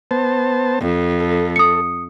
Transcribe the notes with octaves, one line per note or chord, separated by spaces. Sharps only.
B3 C5 A5
F2
A4
D#6 C#7